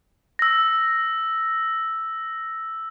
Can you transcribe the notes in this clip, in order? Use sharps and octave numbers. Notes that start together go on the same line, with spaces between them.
E6 A#6